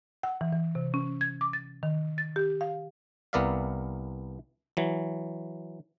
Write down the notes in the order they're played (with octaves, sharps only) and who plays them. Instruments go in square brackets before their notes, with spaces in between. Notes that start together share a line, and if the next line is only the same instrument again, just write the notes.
[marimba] F#5
E3
E3
C3
C#4
G#6
D6
A6
D#3
A6
G4
F5
[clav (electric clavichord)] C2 B3 A#4 D5 E5 F5
E3 F#3